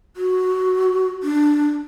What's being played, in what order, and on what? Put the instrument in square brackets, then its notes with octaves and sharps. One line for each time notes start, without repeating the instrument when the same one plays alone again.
[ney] F#4
D4